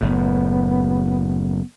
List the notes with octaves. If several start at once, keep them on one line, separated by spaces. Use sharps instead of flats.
F#1 A2 B3